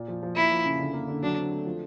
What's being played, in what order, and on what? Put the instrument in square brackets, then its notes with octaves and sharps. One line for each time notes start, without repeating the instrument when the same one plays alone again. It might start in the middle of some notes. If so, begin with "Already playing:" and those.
Already playing: [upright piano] A#2
F3
F3
[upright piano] A#3 [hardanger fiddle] E4
[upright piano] F3
C#3
D3
A#3
D3
[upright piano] F#3 [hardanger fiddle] D4
[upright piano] C4
A3
F3